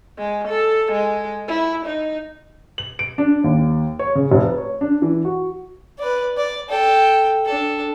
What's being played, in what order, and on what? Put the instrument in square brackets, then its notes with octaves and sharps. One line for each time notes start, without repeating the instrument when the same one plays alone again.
[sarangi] G#3
A4
G#3
E4
D#4
[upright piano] F#7
D7
D4
D#2
C#5
C#3
F1
B4
C#5
D4
E3
F#4
[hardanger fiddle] B4 D5
D5
A4 G5
D4 A4